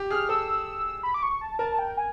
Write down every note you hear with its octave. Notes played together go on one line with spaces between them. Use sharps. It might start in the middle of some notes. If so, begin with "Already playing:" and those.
Already playing: G4
G#4 F6
A4 E6
B5
D6
C#6
A5
A#4 A5
G5
G#5